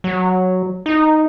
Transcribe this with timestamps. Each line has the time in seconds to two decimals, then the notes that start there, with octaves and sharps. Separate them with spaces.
0.04 F#3
0.86 D#4